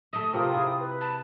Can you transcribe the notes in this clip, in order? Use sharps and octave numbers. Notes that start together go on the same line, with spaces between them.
A3 E5 D#6
C3 F4 A#4 C5 G5
E4 G#4
B4
A5